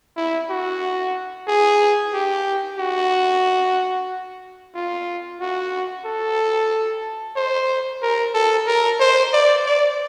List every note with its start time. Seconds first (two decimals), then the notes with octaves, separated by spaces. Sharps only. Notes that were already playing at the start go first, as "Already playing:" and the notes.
0.17 E4
0.50 F#4
1.48 G#4
2.13 G4
2.79 F#4
4.74 F4
5.40 F#4
6.05 A4
7.36 C5
8.02 A#4
8.34 A4
8.67 A#4
9.00 C5
9.33 D5
9.66 D5